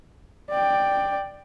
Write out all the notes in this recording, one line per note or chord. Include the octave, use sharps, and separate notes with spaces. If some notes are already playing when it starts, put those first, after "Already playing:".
D5 G5